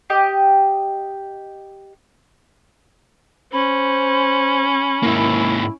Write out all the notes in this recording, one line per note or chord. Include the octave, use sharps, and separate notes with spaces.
G4 D#5
C#4 C5 B5
G#2 A#3 E4